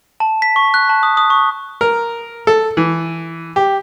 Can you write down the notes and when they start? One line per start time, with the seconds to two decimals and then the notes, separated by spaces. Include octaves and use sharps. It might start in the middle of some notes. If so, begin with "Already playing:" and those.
0.20 A5
0.42 B6
0.56 C#6
0.74 F#6
0.89 A5
1.03 D#6
1.17 D#6
1.30 C#6
1.81 A#4
2.47 A4
2.77 E3
3.56 G4